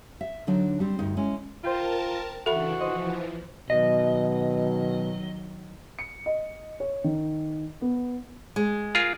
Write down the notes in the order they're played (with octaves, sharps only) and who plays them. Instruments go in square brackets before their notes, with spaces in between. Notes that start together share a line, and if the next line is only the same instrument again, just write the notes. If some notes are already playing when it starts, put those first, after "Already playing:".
[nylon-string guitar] E5
D3 F#3 D4 D#4
G3 C4
D2 G2 D#4
G#3 C#4 E4
[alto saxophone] F4 [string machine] A#4 A5 [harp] C5 G5 A#5
[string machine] C#3 E3 D4 [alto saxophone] F#4 [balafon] A4 E5 B5
[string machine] E3 F3 [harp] C5 D#5
[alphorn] B2 [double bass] D#3 F#3 [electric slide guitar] D#5
[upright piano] C#7
D#5
C#5
D#3
B3
[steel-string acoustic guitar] G#3
[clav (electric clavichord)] F4 G#4 A#4